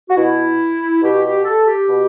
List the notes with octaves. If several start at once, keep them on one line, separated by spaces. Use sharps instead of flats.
F#4
B2 E4
B2 G4
G4
A4
G4
B2